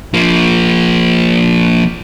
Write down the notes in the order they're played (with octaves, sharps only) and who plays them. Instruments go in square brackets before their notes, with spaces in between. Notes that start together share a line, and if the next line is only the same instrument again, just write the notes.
[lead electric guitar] F3 A#3